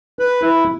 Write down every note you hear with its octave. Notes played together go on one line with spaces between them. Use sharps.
B4
E4